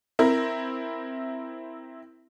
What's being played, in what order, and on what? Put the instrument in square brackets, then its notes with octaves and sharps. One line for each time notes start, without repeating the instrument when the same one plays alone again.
[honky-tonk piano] C4 E4 A#4